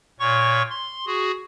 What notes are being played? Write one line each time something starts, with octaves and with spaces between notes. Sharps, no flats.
A#2 C#5 C#6
C6
F#4 G#4